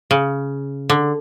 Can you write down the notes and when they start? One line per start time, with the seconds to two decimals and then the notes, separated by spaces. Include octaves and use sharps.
0.11 C#3
0.90 D3